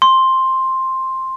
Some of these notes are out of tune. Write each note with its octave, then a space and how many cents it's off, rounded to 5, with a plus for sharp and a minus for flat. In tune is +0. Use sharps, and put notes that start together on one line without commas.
C6 +5